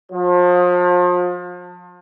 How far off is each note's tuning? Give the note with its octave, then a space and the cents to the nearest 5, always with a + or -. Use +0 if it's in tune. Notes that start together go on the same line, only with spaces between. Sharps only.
F3 +35